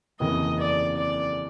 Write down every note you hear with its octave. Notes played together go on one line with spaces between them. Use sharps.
F1 D#2 C#3 E3 D#5
D5
D5